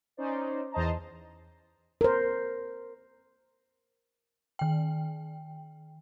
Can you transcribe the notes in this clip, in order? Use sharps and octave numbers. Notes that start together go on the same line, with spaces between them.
C#4 D#4 C5 D5
E2 C5 D#5 A5 A#5
A#4 C5
D#3 G5